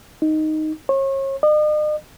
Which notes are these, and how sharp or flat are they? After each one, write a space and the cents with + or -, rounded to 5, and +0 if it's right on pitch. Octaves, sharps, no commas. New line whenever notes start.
D#4 +0
C#5 -35
D#5 -45